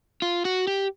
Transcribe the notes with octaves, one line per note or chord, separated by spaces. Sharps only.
F4
F#4
G4